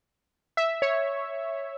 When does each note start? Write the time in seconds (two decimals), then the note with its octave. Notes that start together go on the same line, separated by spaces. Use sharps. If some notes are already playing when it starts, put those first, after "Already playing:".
0.57 E5
0.82 C#5